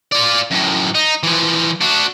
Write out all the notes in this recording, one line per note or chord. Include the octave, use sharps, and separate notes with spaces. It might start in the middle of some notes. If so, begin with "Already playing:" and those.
F4 D5
F#2 A2
D#4
E3 F3
D4 F#4